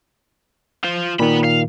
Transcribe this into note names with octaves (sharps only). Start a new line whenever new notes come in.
F4 C5
A#2 D#3 B3 B5
F5